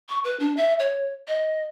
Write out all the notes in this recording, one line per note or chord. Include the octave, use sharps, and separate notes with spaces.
C#6
B4
D4
E5
C#5
D#5